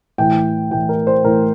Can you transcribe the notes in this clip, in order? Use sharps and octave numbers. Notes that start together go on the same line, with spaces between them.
A2 E3 G5
A2 E3 G5
A#4
C5
A2 E3 A#4